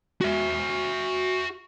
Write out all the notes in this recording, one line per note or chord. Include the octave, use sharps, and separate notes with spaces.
F#4 E5